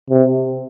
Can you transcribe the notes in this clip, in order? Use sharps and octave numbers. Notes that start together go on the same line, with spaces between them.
C3